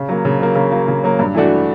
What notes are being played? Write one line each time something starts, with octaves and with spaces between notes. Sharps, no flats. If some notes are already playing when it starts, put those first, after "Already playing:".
Already playing: C#3
F#3 A#3
C#3
F#3 A#3
C#3
F#3 A#3
C#3
F#3 A#3
G2
E3 A3 D4 F#4